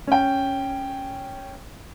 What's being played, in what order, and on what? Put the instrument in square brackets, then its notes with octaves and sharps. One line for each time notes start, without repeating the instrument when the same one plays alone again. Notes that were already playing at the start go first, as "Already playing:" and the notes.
[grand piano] C#4 G5